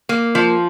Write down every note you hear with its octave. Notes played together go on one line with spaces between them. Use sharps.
A#3
F3